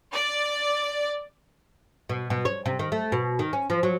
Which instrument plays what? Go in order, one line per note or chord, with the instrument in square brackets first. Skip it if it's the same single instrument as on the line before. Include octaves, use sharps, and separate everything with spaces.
[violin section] D5
[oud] B2
B2
C#5
C3
D#3
A3
B2
D#3
C#4
F3
F#3